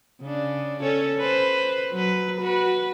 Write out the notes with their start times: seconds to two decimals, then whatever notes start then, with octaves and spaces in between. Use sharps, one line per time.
0.22 C#3 D4
0.81 C#4 A4 C#5
1.19 B4 C5
1.92 F#3 B4
2.40 F#4 B4